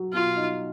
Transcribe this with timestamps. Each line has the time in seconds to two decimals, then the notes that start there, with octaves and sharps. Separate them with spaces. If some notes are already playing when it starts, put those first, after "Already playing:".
Already playing: F#3
0.13 B2 F4
0.36 D#4